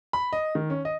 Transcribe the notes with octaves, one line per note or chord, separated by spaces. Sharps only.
B5
D#5
D#3
C#4
D#5